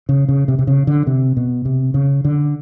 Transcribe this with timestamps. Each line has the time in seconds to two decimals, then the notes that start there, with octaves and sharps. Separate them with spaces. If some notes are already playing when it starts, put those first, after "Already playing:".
0.09 C#3
0.28 C#3
0.48 C3
0.59 C3
0.67 C#3
0.87 D3
1.07 C3
1.37 B2
1.65 C3
1.94 C#3
2.25 D3